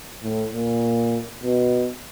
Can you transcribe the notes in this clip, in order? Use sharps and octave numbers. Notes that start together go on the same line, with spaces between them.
A2
A#2
B2